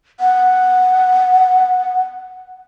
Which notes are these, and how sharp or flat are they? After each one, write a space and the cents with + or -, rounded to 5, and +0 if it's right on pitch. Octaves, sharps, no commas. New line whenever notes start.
F#5 -5